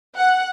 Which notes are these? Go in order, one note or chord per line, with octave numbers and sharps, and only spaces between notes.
F#5